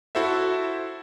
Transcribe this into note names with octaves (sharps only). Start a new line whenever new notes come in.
E4 F#4 A4 C5 E5